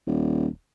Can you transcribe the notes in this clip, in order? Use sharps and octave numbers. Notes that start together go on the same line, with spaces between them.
D#1